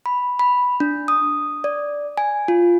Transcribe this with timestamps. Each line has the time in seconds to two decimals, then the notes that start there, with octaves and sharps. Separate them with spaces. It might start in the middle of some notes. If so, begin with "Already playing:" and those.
0.06 B5
0.39 B5
0.80 D4
1.08 D#6
1.64 D5
2.17 G#5
2.48 F4